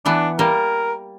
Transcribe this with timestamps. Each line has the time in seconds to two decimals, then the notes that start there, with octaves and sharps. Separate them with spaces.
0.06 E3 B3 D4
0.39 G3 A#3 A#4